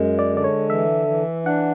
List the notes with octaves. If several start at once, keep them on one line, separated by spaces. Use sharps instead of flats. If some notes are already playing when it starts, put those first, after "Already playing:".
Already playing: F#2 G#3
D5
D3 D5
C#5
E3 E5
E3
D4 F#5